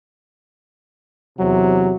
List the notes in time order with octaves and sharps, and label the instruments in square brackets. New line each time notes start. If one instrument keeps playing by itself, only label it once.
[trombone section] E2 C3 [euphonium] F#3